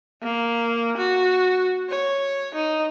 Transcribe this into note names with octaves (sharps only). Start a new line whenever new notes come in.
A#3
F#4
C#5
D#4